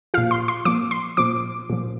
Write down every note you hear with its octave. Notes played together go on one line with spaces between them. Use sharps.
A#2 F3 F5
C6
C6
A#2 F3 D6
C6
A#2 F3 D6
A#2 F3